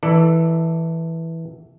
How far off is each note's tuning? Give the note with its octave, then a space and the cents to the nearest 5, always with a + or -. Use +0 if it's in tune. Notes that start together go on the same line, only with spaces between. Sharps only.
E3 -10 A4 +10 D5 +30